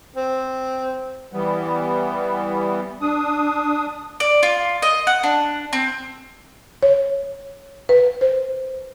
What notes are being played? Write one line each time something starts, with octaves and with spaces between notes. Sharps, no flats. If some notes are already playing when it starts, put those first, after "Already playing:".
C4
E3 G3 B3
D4 D#6
D5
F4
D#5
F#5
D4
C4
C#5
B4
C5